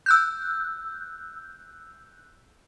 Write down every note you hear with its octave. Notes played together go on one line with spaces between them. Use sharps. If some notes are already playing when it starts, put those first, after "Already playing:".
E6 F#6 G6